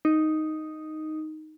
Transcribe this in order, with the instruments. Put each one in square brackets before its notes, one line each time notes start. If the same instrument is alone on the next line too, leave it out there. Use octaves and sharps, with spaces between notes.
[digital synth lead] D#4